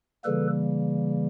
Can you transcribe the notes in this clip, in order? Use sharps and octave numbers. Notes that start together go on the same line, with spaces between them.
C#3 E3 G3 A#3 A4 B4